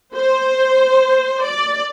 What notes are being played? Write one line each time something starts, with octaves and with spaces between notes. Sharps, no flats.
C5
D5